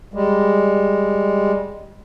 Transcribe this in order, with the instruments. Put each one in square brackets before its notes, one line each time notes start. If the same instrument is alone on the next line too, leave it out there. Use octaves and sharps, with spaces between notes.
[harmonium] G3 G#3